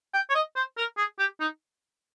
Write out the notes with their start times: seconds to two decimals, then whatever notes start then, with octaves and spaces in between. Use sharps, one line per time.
0.14 G5
0.30 C#5
0.35 D#5
0.56 C5
0.77 A#4
0.97 G#4
1.19 G4
1.40 D#4